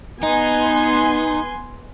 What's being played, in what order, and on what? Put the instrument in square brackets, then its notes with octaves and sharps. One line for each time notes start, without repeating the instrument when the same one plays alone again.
[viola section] B3 G#5 C6 [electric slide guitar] D#4